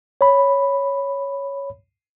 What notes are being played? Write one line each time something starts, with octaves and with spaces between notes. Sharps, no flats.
C#5 B5